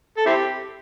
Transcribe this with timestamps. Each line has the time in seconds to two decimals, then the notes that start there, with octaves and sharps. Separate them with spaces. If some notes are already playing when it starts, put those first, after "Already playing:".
0.17 A4
0.26 C4 E4 G4